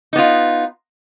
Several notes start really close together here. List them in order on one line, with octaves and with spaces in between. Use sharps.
D#4 B3 F4